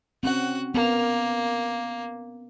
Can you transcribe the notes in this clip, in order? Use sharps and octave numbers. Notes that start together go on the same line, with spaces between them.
C4 C#4 F#4 F#5 F#6
A#3 B3 A#4